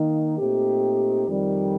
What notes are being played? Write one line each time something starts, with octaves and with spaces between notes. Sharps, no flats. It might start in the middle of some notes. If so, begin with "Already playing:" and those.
Already playing: D#3 A#3 D#4
A#2 A3 C4 D#4 G4
F2 D#3 G3